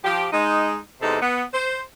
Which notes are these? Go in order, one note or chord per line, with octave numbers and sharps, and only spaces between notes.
F3 G4
G#3 D#4
E2 C3 G#3 D#4 A4
B3
C5